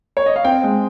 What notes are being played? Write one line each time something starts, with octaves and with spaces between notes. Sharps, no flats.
C#5
D#5
F5
C4 G5
G#3